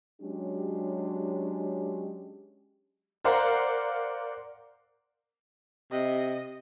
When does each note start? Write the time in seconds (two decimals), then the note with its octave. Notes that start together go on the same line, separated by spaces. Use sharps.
0.21 F#3 G#3 C#4 D4 G4
3.24 A#4 C5 D5 F5 F#5 A#5
5.92 C3 D#5